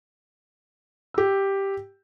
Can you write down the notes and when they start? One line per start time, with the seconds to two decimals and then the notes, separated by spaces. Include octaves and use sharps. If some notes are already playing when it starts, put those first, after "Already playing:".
1.14 G4 E6